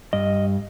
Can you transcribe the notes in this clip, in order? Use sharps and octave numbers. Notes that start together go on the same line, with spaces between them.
G2 D#5